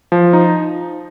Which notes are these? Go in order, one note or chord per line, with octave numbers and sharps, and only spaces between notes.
F3
D#4